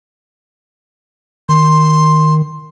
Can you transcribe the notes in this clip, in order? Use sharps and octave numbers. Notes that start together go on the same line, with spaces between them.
D#3 C6